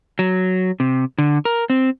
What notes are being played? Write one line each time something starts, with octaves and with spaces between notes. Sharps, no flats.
F#3
C3
D3
A#4
C4